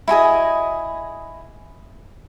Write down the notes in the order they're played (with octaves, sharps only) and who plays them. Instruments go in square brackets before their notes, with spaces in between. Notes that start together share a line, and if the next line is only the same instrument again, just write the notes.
[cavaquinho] E4 F#4 G#4 D#5